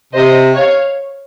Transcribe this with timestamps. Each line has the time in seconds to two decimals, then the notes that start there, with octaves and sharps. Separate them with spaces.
0.12 C3 C5 D#5
0.55 C#5 F5